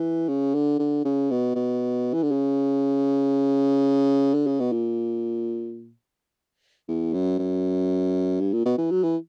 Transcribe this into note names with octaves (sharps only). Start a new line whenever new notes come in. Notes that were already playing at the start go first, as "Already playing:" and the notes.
Already playing: E3
C#3
D3
D3
C#3
B2
B2
E3
D3
C#3
D3
C#3
B2
A#2
E2
F#2
F#2
G2
A#2
B2
E3
F#3
E3